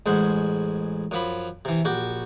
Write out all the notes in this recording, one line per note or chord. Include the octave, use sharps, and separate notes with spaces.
A1 G#3 C5 F#5
F#2 F3 B5
C3 E3
A#1 F#4 G4 C#6